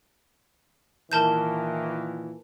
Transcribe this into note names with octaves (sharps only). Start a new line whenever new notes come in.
A#2 D#3 E3 A#4 A5 G6